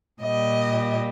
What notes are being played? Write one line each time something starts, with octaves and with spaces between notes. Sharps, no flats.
A#2 G3 D#5